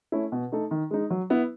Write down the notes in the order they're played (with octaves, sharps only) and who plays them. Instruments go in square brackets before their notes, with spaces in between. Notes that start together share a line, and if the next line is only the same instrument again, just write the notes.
[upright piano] A3 C#4 E4
B2
A3 D#4 A4
D#3
G#3 D#4
F#3
B3 E4